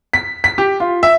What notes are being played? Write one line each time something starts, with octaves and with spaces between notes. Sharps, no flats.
B6
B6
G4
F4
E5